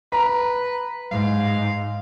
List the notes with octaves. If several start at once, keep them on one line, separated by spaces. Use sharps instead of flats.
B4 A#5
G#2 F5